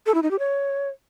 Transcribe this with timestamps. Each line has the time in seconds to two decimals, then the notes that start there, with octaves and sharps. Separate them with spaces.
0.06 A4
0.14 E4
0.23 D#4
0.31 G4
0.39 C#5